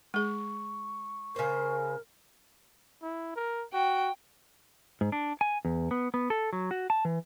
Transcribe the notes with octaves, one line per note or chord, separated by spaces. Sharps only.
G#3 G#4 C#6
C#3 A#4 C5
E4
A#4
F#4 G5
G#2
D4
G#5
E2
B3
B3
A4
F#3
F#4
A5
E3